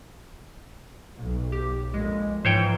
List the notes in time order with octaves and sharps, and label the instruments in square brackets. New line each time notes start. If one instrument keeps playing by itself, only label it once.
[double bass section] B1
[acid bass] G4
[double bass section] A#1 F2 [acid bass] G#3
[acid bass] G#2 [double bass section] E3 F3 [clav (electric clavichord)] C5 C#5 G5